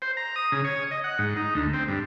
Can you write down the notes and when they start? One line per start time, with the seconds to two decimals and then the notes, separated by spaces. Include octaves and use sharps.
0.02 C5
0.17 A#5
0.36 D#6
0.52 C#3
0.64 C#5
0.91 D#5
1.04 F#5
1.19 G#2
1.37 D#4
1.55 D2
1.74 C4
1.88 G2